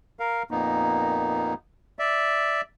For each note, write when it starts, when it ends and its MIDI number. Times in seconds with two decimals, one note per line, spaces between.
0.19 0.43 70
0.19 0.43 77
0.51 1.54 41
0.51 1.54 46
0.51 1.54 58
0.51 1.54 59
0.51 1.54 63
1.99 2.61 74
1.99 2.61 76